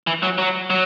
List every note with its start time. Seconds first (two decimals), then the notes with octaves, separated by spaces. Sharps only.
0.07 E3
0.23 F#3
0.38 F#3
0.70 F#3